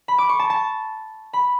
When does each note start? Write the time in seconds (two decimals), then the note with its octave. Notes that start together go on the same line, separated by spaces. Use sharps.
0.08 B5
0.18 D6
0.29 C#6
0.39 A5
0.50 A5
1.33 B5